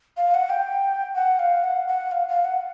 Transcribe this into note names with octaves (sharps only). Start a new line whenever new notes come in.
F5
F#5
G5
F#5
F5
F#5
F#5
F5
F5
F#5